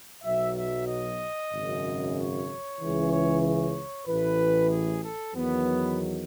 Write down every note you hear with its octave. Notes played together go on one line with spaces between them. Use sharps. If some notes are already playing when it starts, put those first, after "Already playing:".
B1 B2 F#3 E5
E5
D#5
G#1 F#2 C#3
C#5
C#2 C#3 E3
C#5
C#5
A1 A2 E3 B4
G#4
A4
E2 D#3 F#3 B3